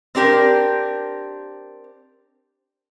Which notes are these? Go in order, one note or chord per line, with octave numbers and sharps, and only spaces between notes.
C4 D4 G4 A#4